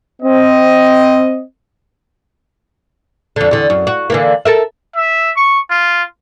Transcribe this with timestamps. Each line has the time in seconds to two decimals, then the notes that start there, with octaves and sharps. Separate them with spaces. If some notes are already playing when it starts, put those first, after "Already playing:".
0.22 C4 D#5
3.36 F2 D3
3.51 E2 D3
3.70 F#2
3.87 F#4
4.10 D3 E3 A#3
4.45 A4 A#4 E5
4.96 E5
5.36 C#6
5.70 F4